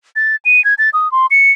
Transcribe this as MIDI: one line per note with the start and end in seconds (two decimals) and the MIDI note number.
0.16 0.36 93
0.45 0.63 99
0.64 0.74 92
0.78 0.90 93
0.93 1.11 87
1.12 1.26 84
1.31 1.51 97